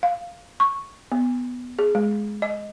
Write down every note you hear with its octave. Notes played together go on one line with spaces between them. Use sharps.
F5
C#6
B3
G#4
G#3
D#5